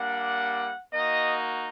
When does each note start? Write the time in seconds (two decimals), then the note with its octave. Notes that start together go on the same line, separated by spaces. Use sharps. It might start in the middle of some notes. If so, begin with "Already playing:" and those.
Already playing: G3 A#3 D4 F#5
0.92 A#3 D#4 F#4 D#5